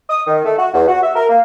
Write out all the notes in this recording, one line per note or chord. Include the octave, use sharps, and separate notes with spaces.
D#6
D#3
A3
F#4
E2
F#4
E5
A#4
A#3